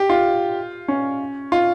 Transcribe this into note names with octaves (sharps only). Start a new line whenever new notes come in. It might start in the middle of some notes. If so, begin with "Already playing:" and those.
Already playing: G4
F4
C#4
F4